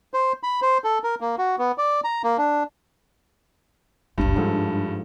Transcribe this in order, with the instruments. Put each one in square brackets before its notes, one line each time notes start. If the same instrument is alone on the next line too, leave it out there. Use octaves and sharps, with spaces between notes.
[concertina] C5
B5
C5
A4
A#4
A#3
F#4
B3
D5
A#5
A#3
D4
[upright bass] F#1 C#2 [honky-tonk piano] G2
[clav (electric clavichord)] G#2 F3 A4 [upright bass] D4